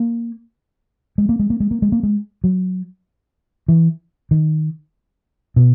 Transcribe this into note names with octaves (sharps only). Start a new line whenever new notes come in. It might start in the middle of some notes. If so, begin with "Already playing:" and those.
Already playing: A#3
G#3
A#3
G#3
A#3
G#3
A#3
G#3
A#3
G#3
F#3
E3
D#3
B2